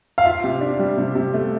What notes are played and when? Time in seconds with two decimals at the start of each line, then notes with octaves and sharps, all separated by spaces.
0.18 F5
0.25 F4 E5
0.44 C3
0.61 D4
0.79 G3
0.98 C3
1.15 C3
1.34 A3